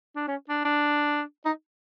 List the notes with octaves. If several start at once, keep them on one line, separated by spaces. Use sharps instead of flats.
D4
C#4
D4
D4
D#4